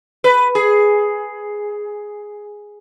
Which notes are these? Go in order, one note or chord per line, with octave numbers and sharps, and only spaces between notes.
B4
G#4